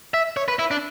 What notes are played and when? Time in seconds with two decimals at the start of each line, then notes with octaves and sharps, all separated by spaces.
0.14 E5
0.37 C#5
0.48 B4
0.59 E4
0.71 D4